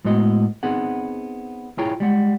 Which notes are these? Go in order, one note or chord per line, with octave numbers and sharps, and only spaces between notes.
A2 G#3 B3 F#4 D#5
B3 C4 D#4 G#4 F#5
E4 F4 G#4 C#5 G5 A#5
G3 G#3 F#5